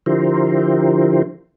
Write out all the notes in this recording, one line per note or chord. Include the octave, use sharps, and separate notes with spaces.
D3 F3 E4 G4 A#4 C5